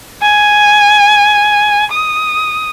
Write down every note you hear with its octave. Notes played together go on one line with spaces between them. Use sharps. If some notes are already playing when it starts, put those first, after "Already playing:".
G#5
D#6